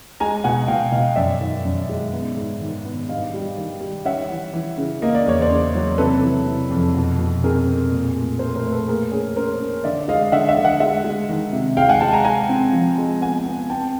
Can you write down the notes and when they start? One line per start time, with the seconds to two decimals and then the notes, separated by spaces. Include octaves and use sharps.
0.20 G#3 G#5 A#5
0.44 B2 F#5 G#5
0.68 B2 F5 G5
0.92 B2 D#5 F5
1.16 F#2 D5 E5
1.41 D#3
1.65 F#2
1.89 G#3
2.13 B3
2.37 G#2
2.61 D#3
2.85 B3
3.09 G2 D#5 F5
3.34 G3
3.57 D#3
3.81 G3
4.05 C#4 E5 F#5
4.30 E3
4.54 E3
4.78 C#3
5.02 A#3 D#5
5.15 D5
5.26 E2 C#5
5.41 C5 D5
5.50 C#3
5.75 F#3
5.98 C3 A4 B4
6.23 E3
6.47 C3
6.70 F2
6.94 B2
7.19 B2
7.44 C4 G#4 A#4
7.67 C4
7.91 A#2
8.15 A3
8.39 A3 A#4 C5
8.56 A#4 C5
8.63 A3
8.71 A4 B4
8.87 A#3 G#4 A#4
9.11 C#4 G#4
9.36 C#4 A#4 C5
9.60 C#4
9.84 D3 D5 E5
10.08 G#3 D#5 F5
10.32 D3 E5 F#5
10.48 E5 F#5
10.57 D3
10.65 E5 F#5
10.80 G#3 E5 F#5
11.04 G#3
11.29 D#3
11.53 C3
11.77 G#3 F5 G5
11.89 F#5 G#5
12.01 G#3 G5 A5
12.13 G#5 A#5
12.25 G#3 G#5 A#5
12.49 C4
12.73 F3
12.98 G#3
13.21 B3 F#5 G#5
13.46 B3
13.70 C4 G5 A5